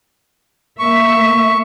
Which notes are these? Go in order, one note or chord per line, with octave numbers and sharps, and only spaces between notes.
A#3 E5 C#6